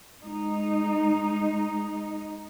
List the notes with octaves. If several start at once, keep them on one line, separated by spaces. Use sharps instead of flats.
G#3 D#4